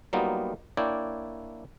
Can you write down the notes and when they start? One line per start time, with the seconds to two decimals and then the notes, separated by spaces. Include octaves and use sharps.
0.13 F#3 G3 A#3 B3 D#4 F4
0.77 A#3 D4 E4 C#5 D5 G5